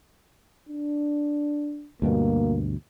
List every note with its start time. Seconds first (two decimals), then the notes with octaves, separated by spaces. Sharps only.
0.69 D4
2.02 D2 G2 B2 A#3